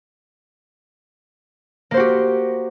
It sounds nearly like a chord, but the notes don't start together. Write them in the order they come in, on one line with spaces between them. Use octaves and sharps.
A#3 C5 F#4 G4